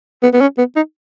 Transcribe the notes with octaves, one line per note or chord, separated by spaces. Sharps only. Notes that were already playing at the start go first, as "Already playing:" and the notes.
B3
B3
C#4
B3
D#4